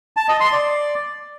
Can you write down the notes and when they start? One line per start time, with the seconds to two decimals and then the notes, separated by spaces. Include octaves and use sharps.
0.17 A5
0.28 D#5
0.40 C6
0.52 D5